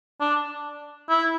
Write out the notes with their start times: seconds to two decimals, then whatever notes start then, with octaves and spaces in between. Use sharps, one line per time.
0.21 D4
1.10 E4